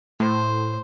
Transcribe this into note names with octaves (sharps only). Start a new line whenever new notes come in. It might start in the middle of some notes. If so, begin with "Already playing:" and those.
A2 C5